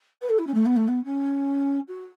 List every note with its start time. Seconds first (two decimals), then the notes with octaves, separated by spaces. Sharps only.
0.21 B4
0.29 A4
0.38 E4
0.47 C#4
0.54 A3
0.65 B3
0.76 A3
0.88 B3
1.04 C#4
1.88 F#4